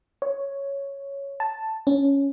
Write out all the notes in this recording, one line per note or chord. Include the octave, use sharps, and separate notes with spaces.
C#5
A5
C#4